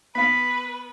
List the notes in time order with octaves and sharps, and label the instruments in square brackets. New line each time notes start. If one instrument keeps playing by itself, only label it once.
[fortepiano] B3 F5 [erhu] B4 [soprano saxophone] B5